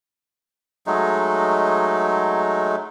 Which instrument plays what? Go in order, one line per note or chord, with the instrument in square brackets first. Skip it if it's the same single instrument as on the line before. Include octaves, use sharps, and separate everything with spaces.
[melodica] F#3 G#3 A3 D#4